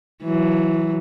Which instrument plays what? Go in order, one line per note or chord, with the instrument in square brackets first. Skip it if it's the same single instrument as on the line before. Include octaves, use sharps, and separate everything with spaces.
[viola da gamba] E3 F#3